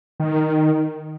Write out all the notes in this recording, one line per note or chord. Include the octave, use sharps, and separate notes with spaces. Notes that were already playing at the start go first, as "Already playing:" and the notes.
D#3